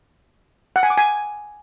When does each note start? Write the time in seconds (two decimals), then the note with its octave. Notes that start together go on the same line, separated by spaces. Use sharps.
0.76 F#5
0.83 G#5
0.90 D6
0.98 G#5